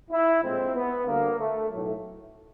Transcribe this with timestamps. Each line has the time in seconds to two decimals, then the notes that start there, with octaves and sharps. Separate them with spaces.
0.11 E4
0.42 A#1 A2 F3 G#3 C4
0.75 B3
1.06 D2 D3 G3 A#3
1.38 A3
1.70 B1 A2 F#3 A3